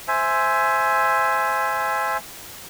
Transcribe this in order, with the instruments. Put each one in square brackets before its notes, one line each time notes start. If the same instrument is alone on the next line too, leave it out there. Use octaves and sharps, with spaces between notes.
[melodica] C5 E5 G#5